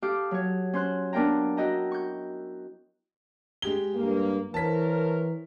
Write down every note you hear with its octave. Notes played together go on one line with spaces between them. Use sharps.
G4 A4 F5 D6 D#6
F#3 C#5
C#4 C5 C6 F#6
B3 D4 A#4 F5 G5 A#5
E4 F#4 D#5 G5 A#5
C#6 G6
G#3 G4 G7
G2 A#3
E3 A#4 C5 C#5 A5 B6